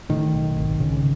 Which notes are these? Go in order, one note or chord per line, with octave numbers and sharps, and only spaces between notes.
A2 D#3
B1
G#1
C#3